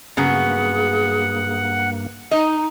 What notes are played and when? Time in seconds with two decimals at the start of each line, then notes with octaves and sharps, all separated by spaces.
0.17 G2 C#3 F#3 A#3 B3 G#4 F#5
2.31 D#4 D#5